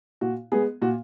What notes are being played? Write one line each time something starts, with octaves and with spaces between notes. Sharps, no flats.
A#2 F#4
G#3 B3 G#4
A#2 F#4